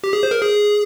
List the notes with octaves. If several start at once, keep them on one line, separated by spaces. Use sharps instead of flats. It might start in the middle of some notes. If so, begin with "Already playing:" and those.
G4
G#4
C5
A#4
G#4